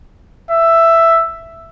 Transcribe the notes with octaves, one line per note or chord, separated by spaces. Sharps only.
E5